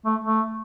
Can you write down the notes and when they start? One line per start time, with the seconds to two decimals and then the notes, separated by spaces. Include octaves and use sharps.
0.06 A3
0.25 A3